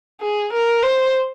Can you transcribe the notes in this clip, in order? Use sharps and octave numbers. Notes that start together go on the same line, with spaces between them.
G#4
A#4
C5